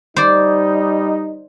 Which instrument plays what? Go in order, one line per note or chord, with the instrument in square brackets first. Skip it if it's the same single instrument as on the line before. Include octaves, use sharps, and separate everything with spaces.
[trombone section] G3 D#4 [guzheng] C5 D5